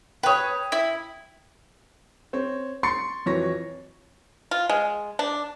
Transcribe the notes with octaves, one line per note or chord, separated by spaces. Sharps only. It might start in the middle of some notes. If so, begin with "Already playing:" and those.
B4 C#5 G5 D#6
E4
C4 C#5
C6 C#6 A6 C7 C#7
F2 E3 F#3 C#5 C#6 A#6
F4
G#3
D4